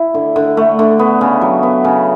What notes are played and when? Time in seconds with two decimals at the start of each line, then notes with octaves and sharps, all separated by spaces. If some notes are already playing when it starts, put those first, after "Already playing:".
Already playing: E4
0.14 D3
0.36 D3
0.57 A3
0.79 D3
0.99 B3
1.21 C#3
1.41 F#3
1.63 B3
1.84 C#3